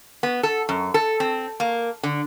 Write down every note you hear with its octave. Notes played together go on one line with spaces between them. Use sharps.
B3
A4
F#2
A4
C4
A#3
D3